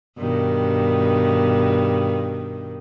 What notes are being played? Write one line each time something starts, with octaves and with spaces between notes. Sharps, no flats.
G2 B2 D#3